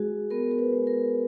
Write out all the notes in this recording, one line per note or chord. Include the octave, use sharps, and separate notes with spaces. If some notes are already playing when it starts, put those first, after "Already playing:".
Already playing: G#3 F#4 G#4
B3 A#4
A#4
B4
G#3
A#4